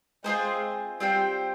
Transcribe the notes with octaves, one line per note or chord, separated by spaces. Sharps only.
G#3 C4 F4 G#4 C5
G3 C4 F4 C5 G5